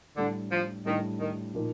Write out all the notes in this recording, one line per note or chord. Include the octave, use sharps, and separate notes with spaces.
A2 D3 G3 D4
F3
A2 D#3 G3 D4
D#3
A#2 F3 A#3 D#4